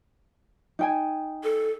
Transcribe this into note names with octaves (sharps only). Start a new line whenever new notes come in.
D#4 G5 G#5
A4